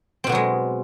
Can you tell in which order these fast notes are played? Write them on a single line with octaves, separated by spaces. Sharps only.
C4 B2 B3 F#3 G#3